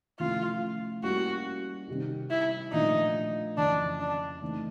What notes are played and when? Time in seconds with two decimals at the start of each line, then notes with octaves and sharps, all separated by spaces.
0.19 C3 F3 A3 C#4 E4 F4
1.03 G3 A#3 C#4 E4 F#4
1.88 C3 D#3 G3
2.30 E4
2.73 A#2 F3 A3 D4 D#4
3.57 F2 C#3 E3 D4
4.00 D4
4.42 C#3 E3 A3 C4 D#4